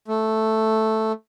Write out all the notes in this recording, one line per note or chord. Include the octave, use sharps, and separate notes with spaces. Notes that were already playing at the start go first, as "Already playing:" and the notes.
A3